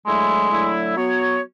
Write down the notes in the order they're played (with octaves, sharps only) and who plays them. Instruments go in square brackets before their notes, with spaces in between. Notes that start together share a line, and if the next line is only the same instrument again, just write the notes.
[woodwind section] D3 F#3 A3 E4 [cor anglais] G#3
[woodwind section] D3 F#3 A3 E4
F#3 B3 F#4 C#5